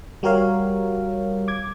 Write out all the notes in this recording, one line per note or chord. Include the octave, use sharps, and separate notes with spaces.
G3 F#4 G4 A#4 C#5 F5
D6 G#6